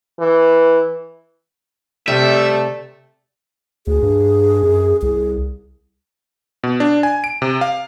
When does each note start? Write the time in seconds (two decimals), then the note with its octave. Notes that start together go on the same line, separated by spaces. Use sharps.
0.20 E3
2.08 C3 G3 A3 E5
3.87 D2 G#4
4.03 G2
4.63 F#2
5.02 C2 G#4
6.63 B2
6.80 D4
7.03 G#5
7.24 D7
7.42 C3
7.61 F5